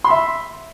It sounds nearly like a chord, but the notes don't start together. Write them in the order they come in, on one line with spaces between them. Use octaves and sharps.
C6 B5 E5